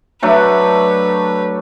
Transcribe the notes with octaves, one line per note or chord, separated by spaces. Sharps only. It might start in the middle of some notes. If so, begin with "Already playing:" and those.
F#3 A3 D4 B4